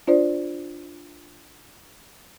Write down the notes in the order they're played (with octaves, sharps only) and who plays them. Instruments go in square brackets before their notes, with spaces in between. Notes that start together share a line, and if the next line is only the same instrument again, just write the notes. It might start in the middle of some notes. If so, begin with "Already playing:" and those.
[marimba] D4 F4 C5 D5